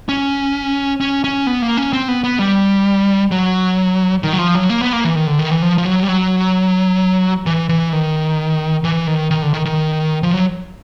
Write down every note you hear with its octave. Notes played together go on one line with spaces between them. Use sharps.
C#4
C#4
C#4
B3
A#3
C#4
C4
B3
B3
G3
F#3
D#3
F#3
F3
F#3
A#3
B3
A#3
E3
D#3
D3
D#3
E3
F3
F3
F#3
G3
F#3
E3
E3
D#3
E3
D#3
D#3
D3
D#3
D#3
F3
F#3